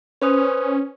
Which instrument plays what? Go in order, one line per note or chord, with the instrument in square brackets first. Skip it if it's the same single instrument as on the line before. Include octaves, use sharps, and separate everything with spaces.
[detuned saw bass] C#4 [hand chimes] B4 C5 D#6